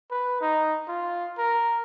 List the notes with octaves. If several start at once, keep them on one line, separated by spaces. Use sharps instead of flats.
B4
D#4
F4
A#4